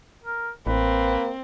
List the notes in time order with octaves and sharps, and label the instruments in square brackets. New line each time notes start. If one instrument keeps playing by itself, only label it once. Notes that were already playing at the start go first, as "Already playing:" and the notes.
[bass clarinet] A#4
[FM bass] A1 [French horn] A#3 [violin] C4 [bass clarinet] B4